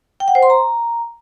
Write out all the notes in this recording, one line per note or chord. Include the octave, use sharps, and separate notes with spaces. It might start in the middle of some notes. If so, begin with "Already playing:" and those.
G5
F#5
C5
C6
A#5